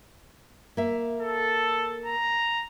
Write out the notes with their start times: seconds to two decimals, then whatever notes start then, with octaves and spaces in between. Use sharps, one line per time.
0.77 A#3 E5
1.21 A4
2.05 A#5